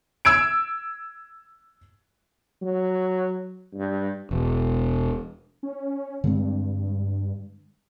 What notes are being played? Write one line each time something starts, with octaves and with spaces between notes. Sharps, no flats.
E6 G#6 D7
F#3
G2
E1
C#4
G2 D3 G#3 C4